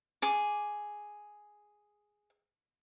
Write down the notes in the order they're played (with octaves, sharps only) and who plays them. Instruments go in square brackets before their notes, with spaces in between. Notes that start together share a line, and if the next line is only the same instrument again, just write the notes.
[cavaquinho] G#4 D6